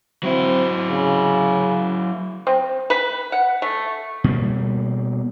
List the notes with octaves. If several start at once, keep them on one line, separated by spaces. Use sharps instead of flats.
F#3 C4 E4
C#3
C4
B4
F#5
A3
B2 G3 A#3